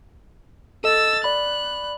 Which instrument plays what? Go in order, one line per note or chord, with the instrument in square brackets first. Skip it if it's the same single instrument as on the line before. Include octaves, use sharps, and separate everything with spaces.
[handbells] A4 D#5 [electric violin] E6 A6
[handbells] D5 B5 [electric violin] F#6